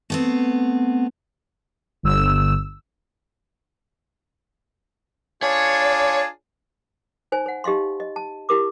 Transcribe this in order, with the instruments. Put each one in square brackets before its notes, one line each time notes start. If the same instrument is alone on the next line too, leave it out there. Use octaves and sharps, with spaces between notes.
[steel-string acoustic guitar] A3 B3 C4
[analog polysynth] G1 E6
[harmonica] D4 F4 G#4 [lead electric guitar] C#5
[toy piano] D#4 C5 G#5
C5 F#5
D#4 G4 D#5 F5 C6
D#5
A5
E4 G4 A#4 D6